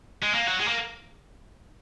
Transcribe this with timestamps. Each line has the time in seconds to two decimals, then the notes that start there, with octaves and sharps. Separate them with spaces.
0.23 G#3
0.35 A#3
0.47 F#3
0.60 G#3
0.68 A#3